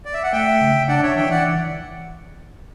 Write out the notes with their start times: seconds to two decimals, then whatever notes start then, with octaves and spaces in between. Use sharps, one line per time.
0.05 D5
0.14 E5
0.23 F#5
0.32 A3 E5 G5
0.61 C#3
0.88 D4 D5 F#5
1.03 C#5 E5
1.16 E3 E5 G5
1.30 D5 F#5